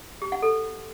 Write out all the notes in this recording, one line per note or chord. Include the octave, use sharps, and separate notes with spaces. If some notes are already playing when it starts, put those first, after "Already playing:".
G4
F#5
A4